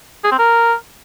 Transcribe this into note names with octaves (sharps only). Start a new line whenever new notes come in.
G#4
C4
A#4